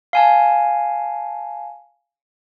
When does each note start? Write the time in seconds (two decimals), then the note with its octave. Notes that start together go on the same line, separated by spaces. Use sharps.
0.13 F5 G#5 A5